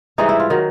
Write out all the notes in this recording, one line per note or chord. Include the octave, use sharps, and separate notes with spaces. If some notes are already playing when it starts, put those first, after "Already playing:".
G#2 E3 G3 D#4
E4
F4
D#3 F#3